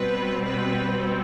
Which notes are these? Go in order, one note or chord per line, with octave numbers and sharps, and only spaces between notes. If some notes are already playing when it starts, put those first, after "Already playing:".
Already playing: B2 G3 C4 B4
B4